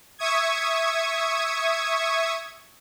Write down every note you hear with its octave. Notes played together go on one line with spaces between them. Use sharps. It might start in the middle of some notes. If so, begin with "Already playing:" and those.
E5 C#6 D#6 G#6